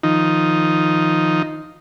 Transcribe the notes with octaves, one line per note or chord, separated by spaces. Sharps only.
D#3 F3 D#4